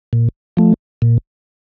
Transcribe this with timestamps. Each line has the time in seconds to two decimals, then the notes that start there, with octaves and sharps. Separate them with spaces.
0.13 A#2
0.57 F3 A3
1.02 A#2